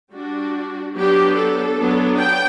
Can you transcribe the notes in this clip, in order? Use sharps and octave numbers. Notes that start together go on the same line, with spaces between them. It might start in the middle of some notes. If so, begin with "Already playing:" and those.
G3 D4 F#4
F#3 B3 D4 G4
A4
F#3 B3 D4
G5